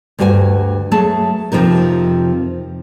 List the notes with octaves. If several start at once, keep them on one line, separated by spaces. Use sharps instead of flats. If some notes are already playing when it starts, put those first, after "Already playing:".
D2 G2 F#4 G5 G#5
F#3 A3 G#4 A5
F2 C3 F3 D#4 A#4